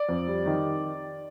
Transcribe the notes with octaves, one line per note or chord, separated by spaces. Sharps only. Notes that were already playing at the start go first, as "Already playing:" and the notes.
Already playing: D5
F2
G3
D#3